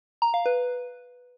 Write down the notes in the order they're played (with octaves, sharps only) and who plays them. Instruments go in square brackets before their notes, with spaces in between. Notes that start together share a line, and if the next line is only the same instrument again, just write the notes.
[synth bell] A#5
F5
B4